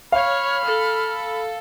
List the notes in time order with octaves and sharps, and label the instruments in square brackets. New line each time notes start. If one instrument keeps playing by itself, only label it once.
[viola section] C#5 [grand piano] F5 [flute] B5 [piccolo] F6
[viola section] A4